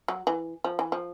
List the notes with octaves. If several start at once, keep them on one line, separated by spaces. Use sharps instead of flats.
F#3
E3
F3
E3
F3